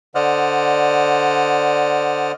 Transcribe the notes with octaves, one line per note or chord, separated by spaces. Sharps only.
D3 C5 D5 D#5 F#5 F6